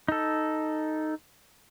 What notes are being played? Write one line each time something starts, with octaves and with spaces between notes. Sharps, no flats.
D#4 A4